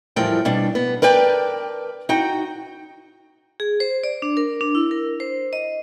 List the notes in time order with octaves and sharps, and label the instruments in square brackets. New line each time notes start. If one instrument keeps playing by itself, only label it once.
[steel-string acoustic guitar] E2 A2 F3 G3 A#4 G5
B2 G3 D4
B3
A#4 B4 D5 G5 A5
D#4 F#4 G5
[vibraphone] G#4
C5
D5
D4
A#4
D4
E4
A#4
C5
D#5